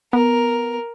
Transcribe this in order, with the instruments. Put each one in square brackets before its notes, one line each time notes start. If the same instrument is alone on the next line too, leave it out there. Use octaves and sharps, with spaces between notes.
[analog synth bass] B3 [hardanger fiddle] A#4